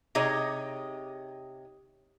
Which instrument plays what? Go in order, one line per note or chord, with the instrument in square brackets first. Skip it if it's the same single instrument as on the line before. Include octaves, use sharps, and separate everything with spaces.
[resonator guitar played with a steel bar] C3 D#4 G#4 C#5 D#5